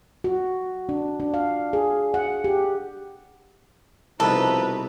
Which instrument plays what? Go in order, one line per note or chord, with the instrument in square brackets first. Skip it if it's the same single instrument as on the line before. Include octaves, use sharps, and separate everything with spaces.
[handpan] F#4
D4
D4
F5
G#4
F#5
G4
[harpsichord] C2 B2 [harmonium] F3 D#4 [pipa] A4 [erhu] B4